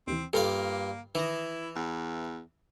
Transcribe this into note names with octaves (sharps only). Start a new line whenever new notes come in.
D#2 C3 E3 C4
G2 A#3 F4 A4 D5
D#3 E3 E4 D#6 A#6
E2